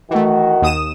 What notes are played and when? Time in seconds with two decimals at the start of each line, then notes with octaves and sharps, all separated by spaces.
0.11 D#3 E3 A3 F#4
0.62 D#2 D#6 E7